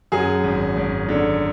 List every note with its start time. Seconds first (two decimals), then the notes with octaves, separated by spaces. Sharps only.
0.12 F#2 G#4
0.44 G#1
0.76 G#1
1.08 D3